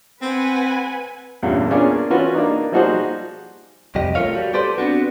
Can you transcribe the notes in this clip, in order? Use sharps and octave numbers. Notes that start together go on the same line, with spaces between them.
C4 B4 F#5 G#5
E2 G2 A#2 C#3
A#3 B3 C#4 D4 F4 G#4
E3 C#4 F4 F#4 B4
A#3 D4 D#4
F3 G3 D#4 F#4 G#4 C5
C2 F2 G4 D#5
A3 B3 F4 A#4 C#5 F5
G3 F#4
G4 A4 B4 C5 D5
B3 C4 D4 F#4